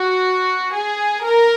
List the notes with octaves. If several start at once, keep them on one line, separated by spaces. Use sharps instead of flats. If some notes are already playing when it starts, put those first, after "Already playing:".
Already playing: F#4
G#4
A#4